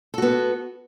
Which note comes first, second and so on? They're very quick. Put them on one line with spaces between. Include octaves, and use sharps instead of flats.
A4 F#4 B3